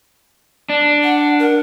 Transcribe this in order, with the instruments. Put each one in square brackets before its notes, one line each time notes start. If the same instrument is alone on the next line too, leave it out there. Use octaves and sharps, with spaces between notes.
[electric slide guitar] D4
[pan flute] F#5
A#4